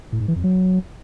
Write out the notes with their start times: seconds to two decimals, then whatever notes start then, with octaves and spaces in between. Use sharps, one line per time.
0.12 A2
0.20 G#2
0.28 E3
0.36 F2
0.44 F#3